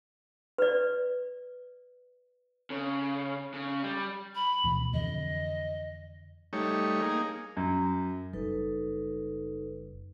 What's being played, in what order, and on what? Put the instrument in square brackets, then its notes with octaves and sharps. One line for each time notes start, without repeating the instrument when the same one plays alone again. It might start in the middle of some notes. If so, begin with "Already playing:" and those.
[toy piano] B4 D5
[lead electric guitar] C#3
C#3
G3
[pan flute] B5
[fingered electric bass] D2 B2 E3
[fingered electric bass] F2 D3 E3 [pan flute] D#5
[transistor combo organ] G3 A3 D#4 C#5
A#3 D#4 G#4
[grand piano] F#2
[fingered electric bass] F#1 G3 [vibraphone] D#4 A4 B4